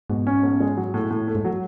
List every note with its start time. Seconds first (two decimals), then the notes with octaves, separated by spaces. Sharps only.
0.09 G#2 B2
0.27 C#4
0.43 B1
0.60 G#3
0.77 F#3
0.94 A2
1.10 A2
1.27 A3
1.35 G#2
1.45 F#3